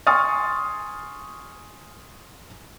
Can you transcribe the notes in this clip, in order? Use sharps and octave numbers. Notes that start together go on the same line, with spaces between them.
G#5 C6 C#6 D#6 F6 A6